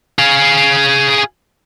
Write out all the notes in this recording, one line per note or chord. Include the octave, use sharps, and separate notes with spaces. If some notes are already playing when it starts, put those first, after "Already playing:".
G#4 F5